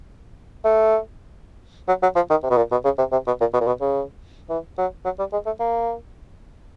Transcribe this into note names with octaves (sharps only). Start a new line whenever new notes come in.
A3
F#3
F#3
F3
D#3
C3
B2
A#2
B2
C#3
C3
C3
B2
A#2
B2
A#2
B2
C#3
E3
F#3
F#3
G3
G#3
A3
A#3